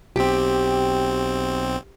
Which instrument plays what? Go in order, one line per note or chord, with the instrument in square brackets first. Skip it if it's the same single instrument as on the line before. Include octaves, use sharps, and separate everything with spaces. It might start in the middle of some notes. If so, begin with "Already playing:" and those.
[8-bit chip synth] B1 C4 [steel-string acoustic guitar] G4